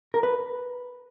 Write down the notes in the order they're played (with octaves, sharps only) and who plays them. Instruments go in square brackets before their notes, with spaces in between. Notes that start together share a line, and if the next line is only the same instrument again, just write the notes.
[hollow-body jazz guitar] A#4
B4